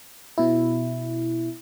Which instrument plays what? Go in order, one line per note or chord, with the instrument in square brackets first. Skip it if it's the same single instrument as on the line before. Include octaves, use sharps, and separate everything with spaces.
[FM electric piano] B2 E4